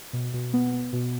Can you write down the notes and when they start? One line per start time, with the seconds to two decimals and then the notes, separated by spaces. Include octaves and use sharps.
0.13 B2
0.34 B2
0.53 B3
0.73 B3
0.93 B2